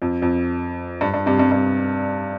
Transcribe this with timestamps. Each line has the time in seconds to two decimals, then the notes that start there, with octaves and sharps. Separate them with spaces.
0.02 F2
0.22 F2
1.01 G2
1.14 G2
1.26 G2 C3
1.39 G2 C3
1.52 G2 C3